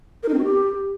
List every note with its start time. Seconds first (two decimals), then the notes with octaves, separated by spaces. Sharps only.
0.23 A#4
0.28 D#4
0.34 C4
0.39 F#4
0.44 G4